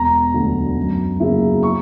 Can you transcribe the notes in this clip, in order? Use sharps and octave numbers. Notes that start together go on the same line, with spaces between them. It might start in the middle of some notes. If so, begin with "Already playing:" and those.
Already playing: E1 A#5
D2 D3 F#3
F#2
C#3 F#3 A#3 E4
C#6